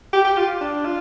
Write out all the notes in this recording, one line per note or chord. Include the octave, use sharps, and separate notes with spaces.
G4
G4
F4
D4
F4